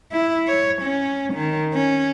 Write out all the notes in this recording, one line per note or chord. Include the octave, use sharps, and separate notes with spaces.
E4
C#5
C#4
D#3
C#4